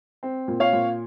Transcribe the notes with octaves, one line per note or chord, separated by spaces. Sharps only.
C4
A#2
C#5 F5
A#2